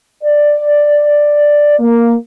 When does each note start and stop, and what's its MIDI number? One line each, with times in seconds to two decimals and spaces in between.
0.23 1.76 74
1.79 2.13 58